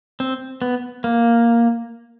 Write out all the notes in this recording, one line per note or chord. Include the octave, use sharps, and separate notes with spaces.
C4
B3
A#3